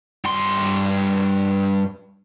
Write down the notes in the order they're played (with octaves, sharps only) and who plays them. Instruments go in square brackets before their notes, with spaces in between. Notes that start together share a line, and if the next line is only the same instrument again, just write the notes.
[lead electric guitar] G2 C6